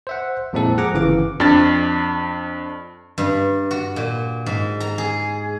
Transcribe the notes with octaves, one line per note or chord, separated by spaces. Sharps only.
C5 E5 F#5
F2 A#2 G#3 C4 E4 A4
F3 G#4 F#5 G#5 A#5 D6
G1 C#3 E3 F5 D6
F2 D4 A6
G2
F#4
A#2
G#2
A#5
G#4